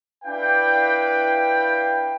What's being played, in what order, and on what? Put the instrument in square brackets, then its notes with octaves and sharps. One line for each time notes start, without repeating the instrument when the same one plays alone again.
[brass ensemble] D4 E4 B4 D5 F5 G5